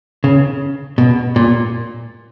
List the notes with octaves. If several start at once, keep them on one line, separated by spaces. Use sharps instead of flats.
C#3
B2
A#2